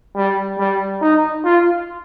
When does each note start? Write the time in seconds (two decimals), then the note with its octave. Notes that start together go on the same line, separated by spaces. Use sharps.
0.16 G3
0.59 G3
1.01 D#4
1.44 F4